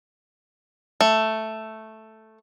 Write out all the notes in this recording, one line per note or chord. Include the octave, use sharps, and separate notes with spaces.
A3